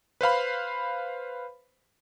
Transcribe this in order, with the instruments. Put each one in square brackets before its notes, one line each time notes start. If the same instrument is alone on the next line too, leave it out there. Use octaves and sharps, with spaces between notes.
[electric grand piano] B4 C5 F5 B5